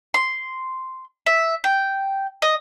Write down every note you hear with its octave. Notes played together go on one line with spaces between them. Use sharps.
C6
E5
G5
D#5